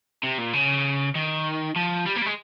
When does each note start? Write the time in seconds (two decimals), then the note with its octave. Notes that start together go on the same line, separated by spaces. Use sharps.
0.23 C3
0.38 A#2
0.54 C#3
1.15 D#3
1.76 F3
2.06 G3
2.16 A#3
2.22 G3
2.26 G#3